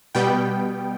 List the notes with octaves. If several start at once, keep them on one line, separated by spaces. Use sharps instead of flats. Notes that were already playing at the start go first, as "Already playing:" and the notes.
B2 G3 B3 G5